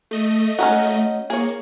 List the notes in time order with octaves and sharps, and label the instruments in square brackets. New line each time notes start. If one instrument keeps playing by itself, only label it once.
[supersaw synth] A3 D#5
[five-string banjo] C#4 D#4 F#4
[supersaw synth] A#3 [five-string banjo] G#4 C#5